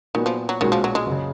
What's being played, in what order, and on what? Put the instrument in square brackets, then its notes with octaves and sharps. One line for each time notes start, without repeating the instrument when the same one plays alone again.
[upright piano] A#2 F#3 B3 [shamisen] D#3
[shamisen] F3
F#3
[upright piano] B1 A#2 G#3 C#4 F#4 [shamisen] D#3
[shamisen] F3
F#3
G#3
[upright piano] F#1
C#3